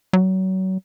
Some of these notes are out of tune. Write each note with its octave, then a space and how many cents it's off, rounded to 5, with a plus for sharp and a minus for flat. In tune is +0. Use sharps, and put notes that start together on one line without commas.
F#3 +30